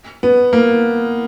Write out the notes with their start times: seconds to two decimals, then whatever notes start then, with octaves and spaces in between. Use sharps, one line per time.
0.23 B3
0.53 A#3